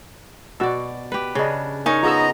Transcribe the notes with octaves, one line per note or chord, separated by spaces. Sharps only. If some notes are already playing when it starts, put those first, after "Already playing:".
B2 F#4 D5 E6
G4 B4
C#3 D4 C#5 D#5
D#4 A#4 C#5 G#5
B3 F4 G#4 D#5 A#5 E6